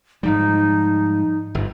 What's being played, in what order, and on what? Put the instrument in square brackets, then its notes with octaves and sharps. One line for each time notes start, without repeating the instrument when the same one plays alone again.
[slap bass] G#2 F3 G3 [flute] D#4
[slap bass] G1 G#2